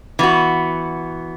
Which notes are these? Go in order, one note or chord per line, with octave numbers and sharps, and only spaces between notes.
E3 B3 F#4